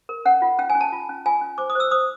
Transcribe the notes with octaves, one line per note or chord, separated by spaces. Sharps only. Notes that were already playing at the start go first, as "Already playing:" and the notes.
A#4
C#4 F#5
F4
C#4 G5
G#5
C#4
A5
F4
C#4
F4 G#5
C#4
C5 D6
D#6
C5 E6
C5 D#6